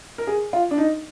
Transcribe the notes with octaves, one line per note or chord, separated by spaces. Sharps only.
A#4
G#4
F4
D4
D#4